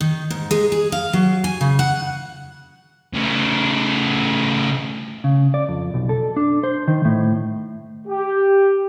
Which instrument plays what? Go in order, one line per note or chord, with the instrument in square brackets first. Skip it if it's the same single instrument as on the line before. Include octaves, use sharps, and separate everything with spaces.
[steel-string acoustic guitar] D#3
G#2
G#3
G#4
F5
F#3
G#5
C#3
F#5
[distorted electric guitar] C#3 A3
[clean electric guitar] C#3
D5
F2
B1
A4
D4
C5
D#3
A2
[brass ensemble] G4